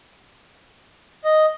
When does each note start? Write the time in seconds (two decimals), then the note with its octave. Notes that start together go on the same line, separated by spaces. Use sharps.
1.24 D#5